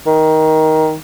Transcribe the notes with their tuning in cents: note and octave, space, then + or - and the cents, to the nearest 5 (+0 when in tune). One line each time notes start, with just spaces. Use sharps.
D#3 +15